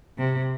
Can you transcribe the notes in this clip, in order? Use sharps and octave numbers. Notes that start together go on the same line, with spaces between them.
C3